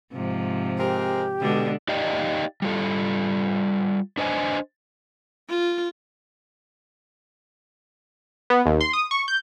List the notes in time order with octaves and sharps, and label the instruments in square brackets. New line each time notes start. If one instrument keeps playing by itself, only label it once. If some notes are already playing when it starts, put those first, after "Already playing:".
[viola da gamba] G#2 C3 F3
[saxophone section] G#3 C4 A#4 [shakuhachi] G4
[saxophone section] B2 [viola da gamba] D3 G#3 D4
[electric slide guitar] D#4 G4 D5 D#5 F5 G5
G3 F4 A4
D4 B4 C5 D#5 F5 G#5
[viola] F4
[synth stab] B3
D#2
C6
D#6
C#6
G6